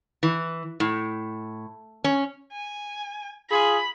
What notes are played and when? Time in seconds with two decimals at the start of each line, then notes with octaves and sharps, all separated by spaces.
0.23 E3
0.80 A2
2.04 C#4
2.53 G#5
3.50 F4 G#4 B5